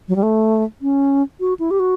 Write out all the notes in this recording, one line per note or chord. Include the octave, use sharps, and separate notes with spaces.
F#3
G3
A3
C#4
F#4
E4
G4
F#4